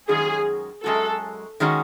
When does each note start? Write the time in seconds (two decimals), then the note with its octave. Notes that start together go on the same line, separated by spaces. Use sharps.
0.09 F#2 D#3 G#3 C#4 F#4 G#4
0.84 F#2 D#3 G#3 C#4 F#4 A4
1.60 D#3 G#3 C#4 F#4